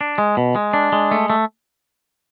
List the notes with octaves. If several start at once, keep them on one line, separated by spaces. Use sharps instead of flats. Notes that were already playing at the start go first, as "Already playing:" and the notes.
D4
G#3
B2
G#3
D4
G#3
A3
A3